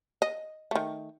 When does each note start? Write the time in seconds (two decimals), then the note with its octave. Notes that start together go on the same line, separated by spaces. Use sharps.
0.22 D#5
0.71 D#3 A3